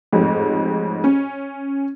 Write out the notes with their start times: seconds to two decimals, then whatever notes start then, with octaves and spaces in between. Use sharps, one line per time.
0.12 A1 F2 G#2
1.04 C#4